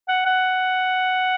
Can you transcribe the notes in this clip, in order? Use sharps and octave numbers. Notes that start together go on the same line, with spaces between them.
F#5
F#5